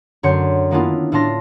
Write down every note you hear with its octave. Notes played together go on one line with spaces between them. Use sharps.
F#2 D3 C#5 C6 G6 C#7
D#3 A#3 B3 D4 E4 F4
A2 D4 F4 A5 C6 A#6